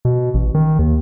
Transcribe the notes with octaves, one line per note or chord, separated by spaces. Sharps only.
B2
A1
D#3
D#2